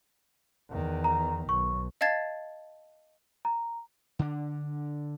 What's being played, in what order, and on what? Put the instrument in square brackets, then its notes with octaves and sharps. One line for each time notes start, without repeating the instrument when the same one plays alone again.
[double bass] E2 D#3
[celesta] A#5
[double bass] B1 [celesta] C#6
[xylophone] D#5 F5 A5 G#6 A6 C7
[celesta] A#5
[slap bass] D3 D4